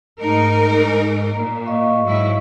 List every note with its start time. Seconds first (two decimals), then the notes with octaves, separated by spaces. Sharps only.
0.22 G#2 A3 D#4 A#4 A#5
0.88 G#3
1.34 A#2 A#5
1.66 D#5 F5 C#6
2.04 G#2 F#3 E4